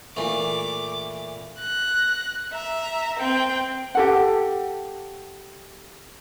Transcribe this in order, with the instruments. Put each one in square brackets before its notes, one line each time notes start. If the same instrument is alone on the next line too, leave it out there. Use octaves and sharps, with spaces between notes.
[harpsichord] A#2 E3 A3 [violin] D6
[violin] F#6 A#6
E5 A#5
C4 G5
[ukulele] G4 A4 F#5